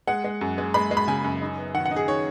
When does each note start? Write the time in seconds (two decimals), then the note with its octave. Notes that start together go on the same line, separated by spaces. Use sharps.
0.07 G#3 F#5
0.24 G#3
0.41 F#2
0.58 G#3
0.74 G#3 B5
0.91 G#3
0.97 B5
1.08 C#3 G#5
1.24 F#2
1.41 D#4
1.58 B3
1.74 D#3 F#5
1.86 F#5
1.91 D#4
1.96 G#4
2.08 D#3 C#5